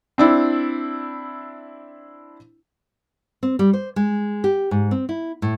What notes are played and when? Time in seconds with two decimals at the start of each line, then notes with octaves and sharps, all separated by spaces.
0.18 C4 D4 E4
3.43 C4
3.59 G3
3.73 C5
3.96 G#3
4.44 G4
4.71 G#2
4.91 C4
5.09 E4
5.42 A2